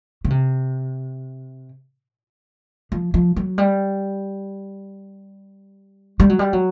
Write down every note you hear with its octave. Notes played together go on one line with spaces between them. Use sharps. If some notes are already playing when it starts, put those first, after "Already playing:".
C#3
C3
F3
F3
F#3
G3
G3
F#3
G3
F#3